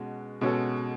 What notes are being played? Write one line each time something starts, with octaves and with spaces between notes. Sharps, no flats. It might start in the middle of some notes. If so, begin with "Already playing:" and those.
Already playing: B2 G#3 C#4 F#4
B2 G#3 C#4 F#4 A4